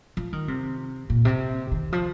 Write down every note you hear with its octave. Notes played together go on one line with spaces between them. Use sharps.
F3
D#3
C3
A#2
C3
D#3
F3